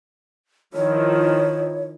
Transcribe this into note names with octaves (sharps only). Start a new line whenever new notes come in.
D#3 F3 E4 C#5